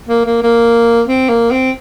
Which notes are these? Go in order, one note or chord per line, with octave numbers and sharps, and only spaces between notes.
A#3
A#3
A#3
C4
A#3
C4